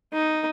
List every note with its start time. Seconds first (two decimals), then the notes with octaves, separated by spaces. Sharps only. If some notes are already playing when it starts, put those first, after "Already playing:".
0.13 D#4